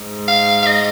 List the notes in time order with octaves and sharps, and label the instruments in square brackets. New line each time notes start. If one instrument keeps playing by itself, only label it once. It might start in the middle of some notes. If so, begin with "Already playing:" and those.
Already playing: [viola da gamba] G#2
[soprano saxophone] F5
F5
D#5